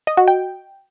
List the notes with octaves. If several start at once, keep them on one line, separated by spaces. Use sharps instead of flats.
D#5
F#4
G5